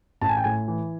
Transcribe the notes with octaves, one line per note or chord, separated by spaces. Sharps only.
A1 A5
G#5
G5
A2 G#5
E3